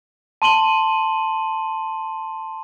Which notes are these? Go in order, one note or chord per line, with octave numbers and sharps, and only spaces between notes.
A5 C6 D#7 F#7 G7